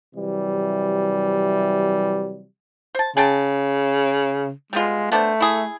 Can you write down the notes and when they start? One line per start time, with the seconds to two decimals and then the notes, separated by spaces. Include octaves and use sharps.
0.15 C3 E3 F#3 G3
2.95 C5 A5
3.17 C#3 G#4 G5 A5
4.73 G3 G#3 B3 F4
5.12 A3 B3 D4 C5
5.40 E4 G#4